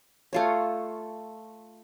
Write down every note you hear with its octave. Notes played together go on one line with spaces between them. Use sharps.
A3 F4 C#5